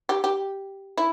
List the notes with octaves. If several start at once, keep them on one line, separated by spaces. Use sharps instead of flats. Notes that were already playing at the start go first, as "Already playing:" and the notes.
G4
G4
E4